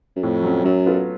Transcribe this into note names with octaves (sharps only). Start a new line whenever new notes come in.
F#2
F2 A2
F#3 C#4
F#2 F#3
B3 F4 A4